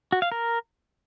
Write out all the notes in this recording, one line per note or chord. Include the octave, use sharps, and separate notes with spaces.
F#4
F5
A#4